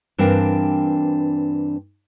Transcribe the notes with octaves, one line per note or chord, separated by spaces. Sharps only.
G2 E3 C4 D4 A#4 F5